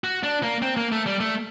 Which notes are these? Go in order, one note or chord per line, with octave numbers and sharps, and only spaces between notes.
F#4
D4
A#3
C4
A#3
A3
G3
A3